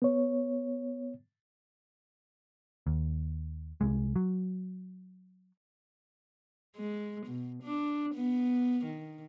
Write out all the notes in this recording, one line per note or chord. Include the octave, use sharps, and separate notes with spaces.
B3 C#5
D#2
C2 G#3
F#3
G#3
B2
D4
B3
D#3